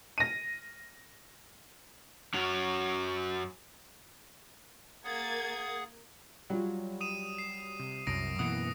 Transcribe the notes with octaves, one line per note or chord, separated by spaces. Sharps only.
A#6 D#7
F#2 F#3
A#3 G#4 F#5 D#6 G#6 A6
F#3 G3 F4
D#6 D#7 E7
C7
C3
C2 F#2 D#6 A#6 D7
F#2 B2 E3 A#3 F#5 D#6